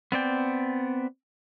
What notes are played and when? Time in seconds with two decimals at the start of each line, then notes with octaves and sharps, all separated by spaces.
0.12 B3 C4 D5 G5